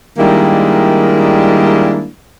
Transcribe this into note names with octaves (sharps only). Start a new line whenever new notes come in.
D#3 G3 G#3 A#3 D4 E4